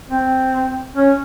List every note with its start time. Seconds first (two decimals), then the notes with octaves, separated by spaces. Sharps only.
0.10 C4
0.95 C#4